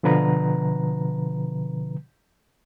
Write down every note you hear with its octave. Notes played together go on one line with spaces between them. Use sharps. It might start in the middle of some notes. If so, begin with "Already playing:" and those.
B2 D3 F3 B4 A#5